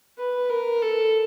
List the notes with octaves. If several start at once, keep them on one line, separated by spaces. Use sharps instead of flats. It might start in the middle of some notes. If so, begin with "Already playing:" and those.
B4
A#4
A4